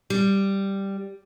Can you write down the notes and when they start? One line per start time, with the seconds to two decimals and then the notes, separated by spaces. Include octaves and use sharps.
0.10 G3